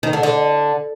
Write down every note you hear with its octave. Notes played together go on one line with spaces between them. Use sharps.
D#3
D3
D3